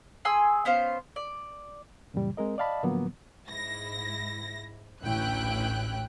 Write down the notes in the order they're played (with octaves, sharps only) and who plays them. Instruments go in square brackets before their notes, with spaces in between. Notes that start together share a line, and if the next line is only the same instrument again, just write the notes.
[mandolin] G#4 G#5 C6 E6
B3 C#4 C5 F5
D5
[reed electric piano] F#2 A#2 C#3 E3 G3
G#3 C4 A#4 D#5
D5 D#5 F5 A5 B5
A2 D3 F3 F#3 A#3 B3
[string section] G#2 E4 A#6
A1 D2 C#4 E4 G5 F#6